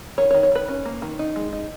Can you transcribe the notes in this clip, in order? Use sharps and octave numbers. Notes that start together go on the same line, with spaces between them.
D#3 C#5
C#5
D#3
C#5
D#3 B4
C#4
A#3
D#3
D#4
G#3
D#4